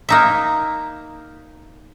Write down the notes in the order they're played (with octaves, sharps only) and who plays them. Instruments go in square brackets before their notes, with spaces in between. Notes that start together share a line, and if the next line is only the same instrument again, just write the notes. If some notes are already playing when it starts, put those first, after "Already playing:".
[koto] A#3 D#4 E5